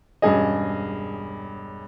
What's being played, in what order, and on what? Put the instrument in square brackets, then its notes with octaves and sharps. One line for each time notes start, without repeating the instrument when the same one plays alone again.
[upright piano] E1 G2 C#4 G#4 D#5